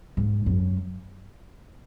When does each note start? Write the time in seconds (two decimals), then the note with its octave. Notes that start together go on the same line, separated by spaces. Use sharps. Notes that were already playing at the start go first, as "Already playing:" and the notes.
0.17 G#2
0.46 F#2